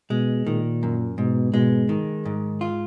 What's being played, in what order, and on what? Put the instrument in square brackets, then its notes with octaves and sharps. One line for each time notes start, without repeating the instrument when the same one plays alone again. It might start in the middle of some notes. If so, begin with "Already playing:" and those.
[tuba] B2 [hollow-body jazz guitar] G#3
[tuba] A#2 [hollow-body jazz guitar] D#3
[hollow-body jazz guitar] F#2
[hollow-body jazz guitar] G#2 [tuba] B2
[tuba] B2 [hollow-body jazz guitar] G#3
[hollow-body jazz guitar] D#3
G#2
F4